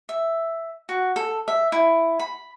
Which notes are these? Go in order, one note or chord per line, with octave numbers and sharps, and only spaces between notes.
E5
F#4
A4
E5
E4
B5